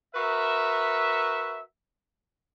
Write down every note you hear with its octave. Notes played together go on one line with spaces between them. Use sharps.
F#4 A#4 B4 E5